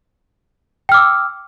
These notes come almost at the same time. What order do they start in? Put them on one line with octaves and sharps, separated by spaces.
G5 F6 D6 E6